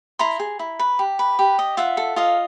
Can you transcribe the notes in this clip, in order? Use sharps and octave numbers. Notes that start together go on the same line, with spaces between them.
E4 A#5 C6
G#4
E4
B4
G4
B4
G4
D#5
F4 E5 F#5
A4
F4 D#5 F5